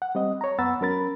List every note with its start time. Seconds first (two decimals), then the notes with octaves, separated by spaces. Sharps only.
0.02 F#5
0.15 G3 C4 D#5
0.41 C#5 A#5
0.59 F#2 B3 F#5 B5 E6 A6
0.81 F#3 C#4 A#4 B5 A6